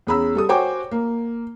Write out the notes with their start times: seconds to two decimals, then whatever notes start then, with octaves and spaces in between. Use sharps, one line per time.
0.07 E2 C#4 G#4 A#5 B5 E6
0.35 G3 A4 D#6
0.49 F#4 C5 C#5 G5 G#5 D6
0.91 A#3